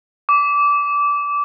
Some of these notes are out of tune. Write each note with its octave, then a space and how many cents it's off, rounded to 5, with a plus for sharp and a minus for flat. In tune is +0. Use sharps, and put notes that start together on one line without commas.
D6 -20